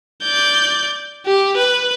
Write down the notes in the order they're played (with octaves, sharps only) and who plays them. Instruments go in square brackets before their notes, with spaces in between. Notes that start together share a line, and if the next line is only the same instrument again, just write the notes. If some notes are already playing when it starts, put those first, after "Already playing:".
[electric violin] D5 G6
G4
B4